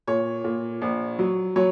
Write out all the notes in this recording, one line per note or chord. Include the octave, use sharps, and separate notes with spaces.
A#2 C#5
A#2
A#1
F#3
F#3 C#5